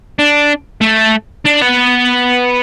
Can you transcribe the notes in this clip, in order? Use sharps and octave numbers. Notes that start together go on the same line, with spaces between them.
D4
A3
D4
B3